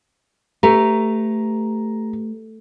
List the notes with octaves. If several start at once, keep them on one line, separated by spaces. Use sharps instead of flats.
A3 G4 B4 A#5